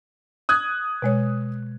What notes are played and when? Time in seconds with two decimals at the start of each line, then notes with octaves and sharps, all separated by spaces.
0.49 D#6 F#6 G#6
1.02 B2 G#3 C#5